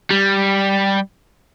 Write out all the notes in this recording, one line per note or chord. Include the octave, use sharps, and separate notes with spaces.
G3